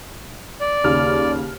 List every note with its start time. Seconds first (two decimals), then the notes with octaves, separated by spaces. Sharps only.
0.60 D5
0.84 D#2 C#3 F6